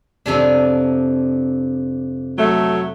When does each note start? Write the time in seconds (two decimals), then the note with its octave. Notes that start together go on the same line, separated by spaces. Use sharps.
0.26 F2 C3 D4
2.38 F#3 A3